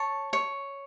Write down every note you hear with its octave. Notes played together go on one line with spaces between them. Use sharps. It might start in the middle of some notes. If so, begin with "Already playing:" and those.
Already playing: C#5 A5
C#5